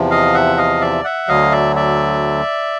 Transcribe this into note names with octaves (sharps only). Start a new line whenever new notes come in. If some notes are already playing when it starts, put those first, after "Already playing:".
Already playing: E2 C3 F3
D#5 F5
E5 F#5
D#5 F5
D5 E5
E5 F#5
D2 D3 F#3 D#5 F5
D5 E5
D5 E5